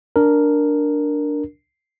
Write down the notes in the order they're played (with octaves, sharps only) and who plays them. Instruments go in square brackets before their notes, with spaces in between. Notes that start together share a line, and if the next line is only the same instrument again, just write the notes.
[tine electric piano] D4 A#4